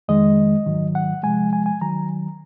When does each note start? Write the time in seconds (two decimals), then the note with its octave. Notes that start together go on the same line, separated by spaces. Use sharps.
0.08 F2 D#3 G#3 D#5
0.66 G#2 D#3 F#3
0.95 F#5
1.23 C3 F3 G#3 G#5
1.53 G#5
1.66 G#5
1.81 D#3 F#3 A#5